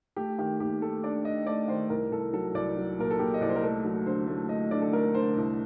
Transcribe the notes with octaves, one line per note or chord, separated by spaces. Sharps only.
A3 G4
D#3 G4
D#2 G4
A3 A4
D4 D5
D4 D#5
A3 D5
D#3 C5
C2 A#4
C2 A4
F#3 A4
C2 D5
F#3
A#2 A#4
A4
A#2 G4
D#5
C2 D5
C5
A#4
A3 A4
F#3
D3 C5
A3
A3 D#5
D3 D5
A4
A3 A#4
D3 C5
C2